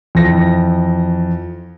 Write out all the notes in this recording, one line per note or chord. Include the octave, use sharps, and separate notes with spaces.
F2 E3 A#6